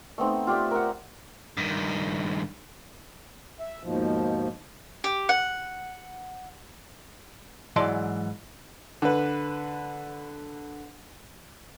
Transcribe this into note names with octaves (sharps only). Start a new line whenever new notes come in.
A3 B3 C4 D#4
F4 G4 D5 E5
A#4 F#5
G2 D#3
E5
D#2 G#2 B2 F3
G4
F#5
G#2 E3 F#3 D5 A5 C6
D3 B4